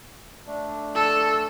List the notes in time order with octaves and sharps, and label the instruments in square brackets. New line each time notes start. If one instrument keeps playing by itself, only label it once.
[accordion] A3 D4
[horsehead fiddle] A4